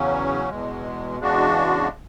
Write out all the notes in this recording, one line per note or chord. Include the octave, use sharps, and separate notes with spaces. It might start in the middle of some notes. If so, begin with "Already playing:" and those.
Already playing: E2 C#3 F#3 C#4
E2 B2 G#3
E2 C#3 G#3 D4 F#4